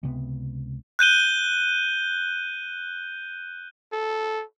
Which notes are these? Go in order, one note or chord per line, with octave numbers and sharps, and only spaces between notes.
C#2 C3 B3
F#6 G6 D#7 G7
A4